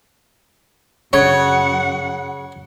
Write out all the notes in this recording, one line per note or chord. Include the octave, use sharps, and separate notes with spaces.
F#2 C#3 C#5 F#5